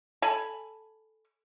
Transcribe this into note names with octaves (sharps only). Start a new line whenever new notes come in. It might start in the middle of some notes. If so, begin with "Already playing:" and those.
A4 G#5 B5